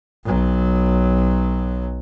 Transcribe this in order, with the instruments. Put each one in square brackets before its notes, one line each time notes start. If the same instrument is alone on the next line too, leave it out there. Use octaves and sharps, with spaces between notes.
[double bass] B1 F#3